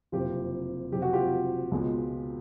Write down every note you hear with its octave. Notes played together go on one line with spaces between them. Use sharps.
F#1 F2 C3 F4 G4
F#1 F2 C3 G4
F#4
F4 G4
C#2 B2 G#3